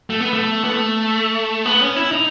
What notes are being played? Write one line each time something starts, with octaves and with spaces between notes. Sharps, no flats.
A3
B3
A3
B3
A3
B3
C#4
E4
D#4